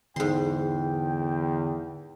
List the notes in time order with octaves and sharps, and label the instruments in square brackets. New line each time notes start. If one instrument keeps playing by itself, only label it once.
[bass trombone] E2 [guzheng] G#2 C6 [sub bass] D3 [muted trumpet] G5